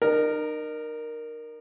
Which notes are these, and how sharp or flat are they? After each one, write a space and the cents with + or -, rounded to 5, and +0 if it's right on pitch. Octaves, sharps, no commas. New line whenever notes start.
D#4 -40 A#4 +0